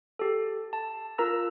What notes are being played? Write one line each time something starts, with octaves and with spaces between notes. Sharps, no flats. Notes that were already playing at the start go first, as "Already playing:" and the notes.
G4 A4
A5
F4 A#4 A#5 E6